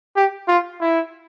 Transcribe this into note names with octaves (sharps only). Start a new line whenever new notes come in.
G4
F4
E4